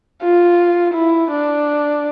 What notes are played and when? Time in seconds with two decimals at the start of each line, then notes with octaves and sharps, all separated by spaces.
0.22 F4
0.94 E4
1.30 D4